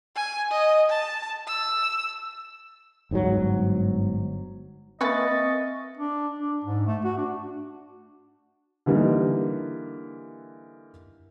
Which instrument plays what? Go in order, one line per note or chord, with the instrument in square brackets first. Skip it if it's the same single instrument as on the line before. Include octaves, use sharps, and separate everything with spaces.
[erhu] G#5
D#5
A5
E6
[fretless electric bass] G1 G#2 D3 F#3
[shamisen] A#3 B4 G#5 [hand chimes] C4 E5 [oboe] D#5 [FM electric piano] C#6 A6
[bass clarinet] D4
D4
G#2
A3
F#4
D4
[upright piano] D3 E3 G3 A#3 D#4